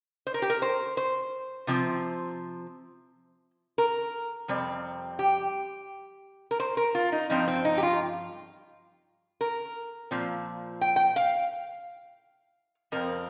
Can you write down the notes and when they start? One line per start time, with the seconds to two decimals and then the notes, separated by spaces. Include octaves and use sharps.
0.27 C5
0.34 A#4
0.42 G4
0.50 A#4
0.62 C5
0.97 C5
1.67 C3 F3 C4
3.78 A#4
4.48 F2 C3 G3 C4
5.19 G4
6.51 A#4
6.60 C5
6.77 A#4
6.95 F4
7.12 D#4
7.30 G2 F3 C4 D#4
7.48 C4
7.65 D#4
7.78 G4
7.83 F4
9.41 A#4
10.11 A#2 F3 C4
10.81 G5
10.96 G5
11.16 F5
12.92 F2 F3 C4 A#4